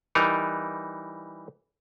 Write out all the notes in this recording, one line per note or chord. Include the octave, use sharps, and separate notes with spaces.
E3 G3 D#4 A#4